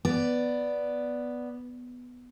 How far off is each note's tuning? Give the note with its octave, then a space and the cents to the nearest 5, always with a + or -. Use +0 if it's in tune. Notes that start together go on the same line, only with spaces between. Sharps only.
B3 +0 D5 +0